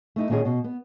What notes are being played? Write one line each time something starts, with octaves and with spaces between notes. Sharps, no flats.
A3 D#4 E4
A#2 D#3 C#4 F4 G#4
B2
B3